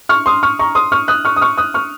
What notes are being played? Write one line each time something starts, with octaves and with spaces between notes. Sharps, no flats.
C#6 F6
C6 D#6
C#6 F6
A#5 C#6
C6 D#6
C#6 F6
D#6 F#6
C#6 F6
D#6
C#6 F6
D#6 F#6
C#6 F6